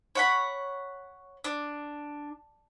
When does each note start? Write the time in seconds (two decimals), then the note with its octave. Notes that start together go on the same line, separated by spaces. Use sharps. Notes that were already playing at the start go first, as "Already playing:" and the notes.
0.15 C#5 F#5 B5
1.44 D4